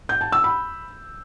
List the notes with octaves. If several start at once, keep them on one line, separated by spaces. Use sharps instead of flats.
G6
A5
E6
B5